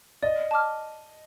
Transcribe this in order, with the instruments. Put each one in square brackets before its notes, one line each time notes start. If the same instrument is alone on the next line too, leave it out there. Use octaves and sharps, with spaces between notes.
[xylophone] D5 [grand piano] D#5
[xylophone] A5 D6 F6